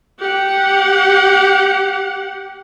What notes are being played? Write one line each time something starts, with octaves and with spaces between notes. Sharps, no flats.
G4 F#5